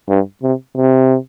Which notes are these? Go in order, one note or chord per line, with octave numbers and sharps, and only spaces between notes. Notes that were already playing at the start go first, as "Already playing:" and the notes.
G2
C3
C3